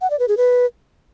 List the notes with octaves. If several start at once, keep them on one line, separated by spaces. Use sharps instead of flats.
F#5
D5
B4
G#4
B4